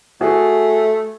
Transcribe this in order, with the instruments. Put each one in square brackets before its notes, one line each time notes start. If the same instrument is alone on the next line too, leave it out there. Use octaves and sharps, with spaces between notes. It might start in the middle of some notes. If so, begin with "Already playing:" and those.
[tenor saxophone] A3 [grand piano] F#4 G#4